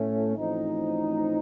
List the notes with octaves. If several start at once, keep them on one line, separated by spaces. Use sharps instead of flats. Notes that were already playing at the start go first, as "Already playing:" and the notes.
Already playing: A2 A3 C#4
A1 A2 F3 C4 D#4